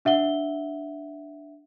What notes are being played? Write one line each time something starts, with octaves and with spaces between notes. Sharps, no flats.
D4 E5 F#5 G7